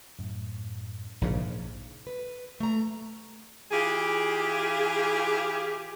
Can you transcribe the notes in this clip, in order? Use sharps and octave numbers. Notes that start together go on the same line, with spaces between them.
F#2 A2
A#1 G#2 C#3
B4
A3 A#5
E3 F4 G4 G#4